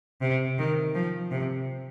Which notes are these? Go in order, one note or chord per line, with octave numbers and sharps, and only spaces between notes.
C3
D#3
F3
C3